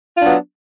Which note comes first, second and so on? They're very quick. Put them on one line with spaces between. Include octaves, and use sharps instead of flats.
F4 D4 F#3 B3